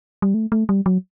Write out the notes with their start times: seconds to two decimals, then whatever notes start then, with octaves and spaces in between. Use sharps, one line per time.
0.22 G3
0.34 A3
0.52 A3
0.69 G3
0.86 F#3